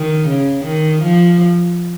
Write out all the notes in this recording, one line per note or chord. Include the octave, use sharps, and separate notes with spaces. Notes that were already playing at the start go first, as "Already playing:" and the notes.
Already playing: D#3
C#3
D#3
F3